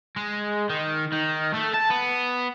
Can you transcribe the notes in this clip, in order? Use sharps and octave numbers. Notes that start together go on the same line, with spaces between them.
G#3
D#3
D#3
A3
A5
B3